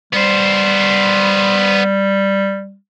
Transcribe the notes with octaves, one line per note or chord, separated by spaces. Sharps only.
G3 B3 C5